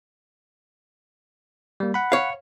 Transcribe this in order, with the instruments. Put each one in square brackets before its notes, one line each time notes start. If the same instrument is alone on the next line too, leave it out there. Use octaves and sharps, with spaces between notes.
[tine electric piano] G3 A#3
F#5 B5
[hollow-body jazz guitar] C#5 F5